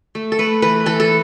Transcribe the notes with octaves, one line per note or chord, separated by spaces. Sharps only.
A3
A4
A3 B4
E3 B4
E3 A4
A4